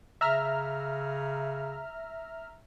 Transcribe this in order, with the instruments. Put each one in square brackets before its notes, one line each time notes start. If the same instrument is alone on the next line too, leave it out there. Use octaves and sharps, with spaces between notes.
[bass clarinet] C#3 [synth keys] E5 A#5 F6